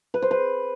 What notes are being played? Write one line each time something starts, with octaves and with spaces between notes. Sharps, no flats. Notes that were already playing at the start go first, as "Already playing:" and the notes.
B4
C5
B4